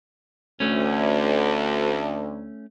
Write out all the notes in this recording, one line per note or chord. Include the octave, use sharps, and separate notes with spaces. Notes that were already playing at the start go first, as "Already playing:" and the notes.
D2 A3 C#4